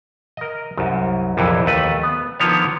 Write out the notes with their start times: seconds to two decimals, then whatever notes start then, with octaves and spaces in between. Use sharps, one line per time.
0.37 A#4 D#5
0.77 C2 F#2
1.37 A#1 F2 C3 E3
1.66 D#2 A3 B4
2.03 B3
2.40 D3 D#3 F3 B3 C#5